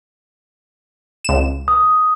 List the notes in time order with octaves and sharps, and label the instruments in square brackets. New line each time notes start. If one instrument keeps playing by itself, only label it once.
[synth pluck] C#2 E7
[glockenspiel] D#6